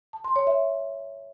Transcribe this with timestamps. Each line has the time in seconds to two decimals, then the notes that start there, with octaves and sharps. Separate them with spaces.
0.13 A5
0.24 C6
0.36 C#5
0.47 E5